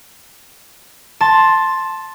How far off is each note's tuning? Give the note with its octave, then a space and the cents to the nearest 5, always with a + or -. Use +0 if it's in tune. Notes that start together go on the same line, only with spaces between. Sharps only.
A5 +0 C6 +10